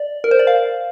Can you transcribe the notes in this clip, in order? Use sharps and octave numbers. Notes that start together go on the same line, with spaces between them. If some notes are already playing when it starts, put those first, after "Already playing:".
Already playing: D5
A#4
C5
D5
F5